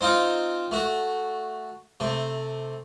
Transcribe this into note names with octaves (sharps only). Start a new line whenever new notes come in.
C4 D#4 F4 F5
A3 F#4
C3 A3